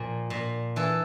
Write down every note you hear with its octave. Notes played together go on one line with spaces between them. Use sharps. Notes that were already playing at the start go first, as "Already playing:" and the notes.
Already playing: A#2 F3
A#2
E3 A4